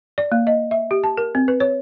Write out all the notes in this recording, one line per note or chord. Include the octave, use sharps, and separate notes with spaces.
D5
A#3
D#5
E5
G4
A5
A#4
C4
B4
C#5